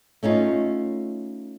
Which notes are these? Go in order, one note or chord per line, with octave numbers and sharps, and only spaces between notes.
A3 C#4 D#4 F4